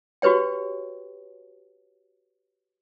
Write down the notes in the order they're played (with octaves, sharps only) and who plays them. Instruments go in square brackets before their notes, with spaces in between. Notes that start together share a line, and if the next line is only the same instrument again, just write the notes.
[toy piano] F#4 G4 B4 C#5 G5